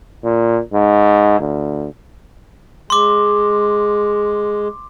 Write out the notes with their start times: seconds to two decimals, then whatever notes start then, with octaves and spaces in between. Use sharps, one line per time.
0.24 A#2
0.73 G#2
1.39 D2
2.90 G#3 C6 D6